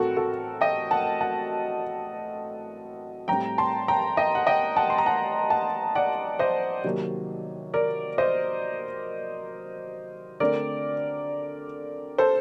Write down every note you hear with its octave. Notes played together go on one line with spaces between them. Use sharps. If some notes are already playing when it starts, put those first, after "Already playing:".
Already playing: A2 A3 C4 F#4 A4 A#4
F#4 A4
D#5 G5
F#5 A5
F#5 A5
A2 G3 C4 G5 A#5
A5 C6
G5 A#5
D#5 G5
F#5
D#5 G5
F#5 A5
C6
A#5
F#5 A5
F#5 A5
D5 F#5
C5 D#5
C3 D#3 F#3 A#3
A#4 D5
C5 D#5
D3 A3 C4 A#4 D5
A4 C5